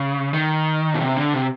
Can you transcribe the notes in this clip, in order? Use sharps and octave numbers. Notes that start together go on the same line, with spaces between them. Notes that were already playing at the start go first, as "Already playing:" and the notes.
Already playing: C#3
D#3
B2
C3
D3
C3